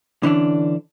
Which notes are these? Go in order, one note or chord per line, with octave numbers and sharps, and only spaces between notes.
D3 E3 C#4 D4